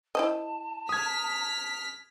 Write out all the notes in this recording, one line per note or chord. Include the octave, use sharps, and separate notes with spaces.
E4 C5 D#5 A5
D#6 F6 G#6 B6